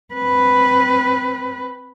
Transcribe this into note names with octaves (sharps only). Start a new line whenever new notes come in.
C4 B4